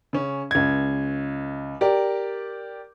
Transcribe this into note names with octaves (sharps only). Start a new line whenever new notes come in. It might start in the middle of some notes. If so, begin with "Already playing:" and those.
C#3 C#4
C#2 G#6
G4 A#4 D5